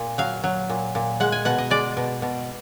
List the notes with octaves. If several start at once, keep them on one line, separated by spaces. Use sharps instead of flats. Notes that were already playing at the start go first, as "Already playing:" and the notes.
Already playing: A#2
F#3 F5
F#3
A#2
A#2
G#3 F#5
G#5
B2 F#5
D#5
G#3 D5
B2
B2